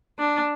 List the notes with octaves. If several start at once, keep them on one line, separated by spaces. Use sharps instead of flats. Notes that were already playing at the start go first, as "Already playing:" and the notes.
D4